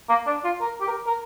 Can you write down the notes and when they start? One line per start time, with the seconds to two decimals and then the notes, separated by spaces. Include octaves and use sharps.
0.09 A#3
0.27 D4
0.44 F4
0.61 A#4
0.81 G4
0.88 A#4
1.07 A#4